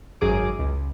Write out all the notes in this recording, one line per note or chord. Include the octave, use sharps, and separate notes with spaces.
G#1 F#2 G#4 D6
C#2